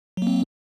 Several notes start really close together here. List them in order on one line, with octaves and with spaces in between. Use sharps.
F#3 A#3 C4